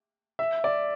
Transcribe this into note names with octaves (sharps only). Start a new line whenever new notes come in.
E5
D5